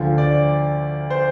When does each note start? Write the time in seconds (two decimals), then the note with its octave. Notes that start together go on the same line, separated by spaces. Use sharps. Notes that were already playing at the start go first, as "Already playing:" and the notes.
Already playing: D2 D3 F3
0.18 D5
1.10 C5